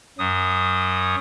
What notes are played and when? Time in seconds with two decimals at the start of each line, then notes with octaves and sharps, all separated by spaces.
0.18 F#2 F#3 D#6